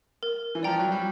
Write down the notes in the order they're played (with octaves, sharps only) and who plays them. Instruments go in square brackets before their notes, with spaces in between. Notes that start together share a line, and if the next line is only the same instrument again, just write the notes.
[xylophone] A#4
[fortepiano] E3
[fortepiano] F3 [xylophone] D5 G5 A#5
[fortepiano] F#3
G3